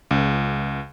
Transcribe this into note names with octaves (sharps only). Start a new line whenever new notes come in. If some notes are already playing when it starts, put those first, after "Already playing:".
C#2